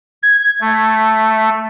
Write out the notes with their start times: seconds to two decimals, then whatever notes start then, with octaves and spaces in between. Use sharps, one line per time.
0.23 G#6
0.61 A3